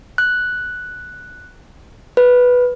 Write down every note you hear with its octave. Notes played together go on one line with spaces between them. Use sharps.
F#6
B4